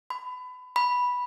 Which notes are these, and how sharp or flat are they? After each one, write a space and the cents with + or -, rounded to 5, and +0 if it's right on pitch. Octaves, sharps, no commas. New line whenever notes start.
B5 +25
B5 -5